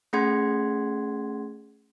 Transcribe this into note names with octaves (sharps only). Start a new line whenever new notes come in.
A3 C#4 G#4 F#5 C6 G#6